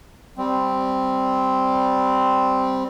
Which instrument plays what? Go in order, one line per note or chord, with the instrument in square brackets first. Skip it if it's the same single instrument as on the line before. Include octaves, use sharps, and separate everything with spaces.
[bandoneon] G3 C4